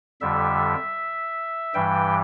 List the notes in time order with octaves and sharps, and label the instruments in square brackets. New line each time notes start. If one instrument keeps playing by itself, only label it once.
[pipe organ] F2 D3 G3 E5
G2 E3 G3 G5